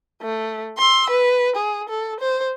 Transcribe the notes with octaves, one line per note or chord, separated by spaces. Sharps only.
A3
C6 E6
B4
G#4
A4
C5